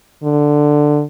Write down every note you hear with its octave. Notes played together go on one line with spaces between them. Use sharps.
D3